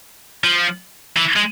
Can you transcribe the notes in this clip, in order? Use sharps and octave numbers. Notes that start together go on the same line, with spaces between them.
F3
E3
G#3